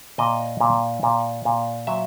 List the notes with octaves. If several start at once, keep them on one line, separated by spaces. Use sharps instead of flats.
A#2 D#5
A#2
A#2
A#2
F#3 E5